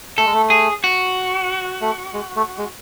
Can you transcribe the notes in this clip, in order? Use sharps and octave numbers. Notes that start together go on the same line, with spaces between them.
A3 A4
G#3
A3
G#4
F#4
A3
G#3
A3
G#3